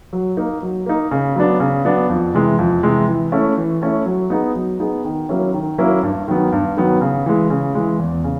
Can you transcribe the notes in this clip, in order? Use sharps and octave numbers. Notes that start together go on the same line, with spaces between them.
F#3
A#3 D#4
F#3
A#3 D#4
C#3
F#3 B3 D4
C#3
F#3 B3 D4
F2
C3 E3 G#3
F2
C3 E3 G#3
E3
A3 C#4 E4
E3
A3 C#4 E4
F#3
B3 D#4 G#4
F#3
B3 D#4 G#4
D#3
F#3 A#3 C#4 E4
D#3
F#3 A#3 C#4 E4
G2
D#3 F#3 B3
G2
D#3 F#3 B3
C#3
E3 G#3
C#3
E3 G#3
E2
C#3